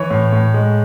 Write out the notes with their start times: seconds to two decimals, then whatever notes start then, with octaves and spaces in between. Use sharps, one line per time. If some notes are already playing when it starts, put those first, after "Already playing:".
Already playing: E3 C#5 C#6
0.10 A2
0.32 A2
0.54 G#3